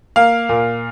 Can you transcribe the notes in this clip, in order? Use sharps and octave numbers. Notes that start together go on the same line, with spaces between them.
A#3 F5
A#2